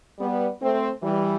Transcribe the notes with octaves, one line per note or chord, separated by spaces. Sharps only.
G3 B3
A3 C4
E3 G3